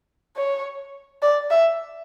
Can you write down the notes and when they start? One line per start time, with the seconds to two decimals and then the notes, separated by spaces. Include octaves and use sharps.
0.36 C#5
1.22 D5
1.51 E5